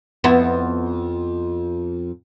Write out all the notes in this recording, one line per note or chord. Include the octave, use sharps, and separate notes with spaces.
F2 B3 E4